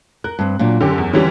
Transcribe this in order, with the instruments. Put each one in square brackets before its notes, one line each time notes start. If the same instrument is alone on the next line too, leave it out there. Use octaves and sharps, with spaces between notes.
[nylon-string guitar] A#4 [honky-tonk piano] F#6
[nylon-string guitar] G2 C4
A#2 F#3 D4
[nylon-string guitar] F#2 [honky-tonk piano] D3 C#4 G4
[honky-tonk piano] E2
[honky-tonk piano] D3 E3 G3 [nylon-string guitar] C#4